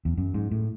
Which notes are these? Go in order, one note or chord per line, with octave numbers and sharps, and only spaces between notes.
E2
F#2
G#2
A2